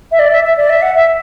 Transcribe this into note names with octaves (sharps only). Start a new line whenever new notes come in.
E5
D5
E5
E5
D5
E5
F#5
E5